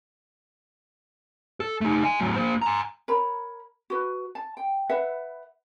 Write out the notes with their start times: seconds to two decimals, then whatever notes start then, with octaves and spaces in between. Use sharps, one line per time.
1.60 A4
1.81 A3 D#4
2.03 D#5 G#5
2.20 A2 F#3
2.36 A#3 C5
2.62 G#5 A#5
3.08 A#4 C#5 B5
3.90 F#4 B4
4.35 A5
4.57 G5
4.90 B4 E5 F#5